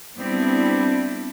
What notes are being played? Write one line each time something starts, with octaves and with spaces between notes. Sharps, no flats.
G3 B3 C4 D4 E4